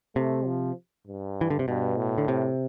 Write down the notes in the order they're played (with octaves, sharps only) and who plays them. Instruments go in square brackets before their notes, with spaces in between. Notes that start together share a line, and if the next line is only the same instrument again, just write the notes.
[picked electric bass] C3 [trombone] A3
[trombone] F3
G2
[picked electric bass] E3
D3
C3
[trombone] G2 [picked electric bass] B2
[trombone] A2
[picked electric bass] D3
C3